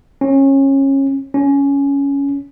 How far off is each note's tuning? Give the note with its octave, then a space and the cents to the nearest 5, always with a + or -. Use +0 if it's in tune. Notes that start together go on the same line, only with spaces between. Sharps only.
C#4 -25
C#4 +10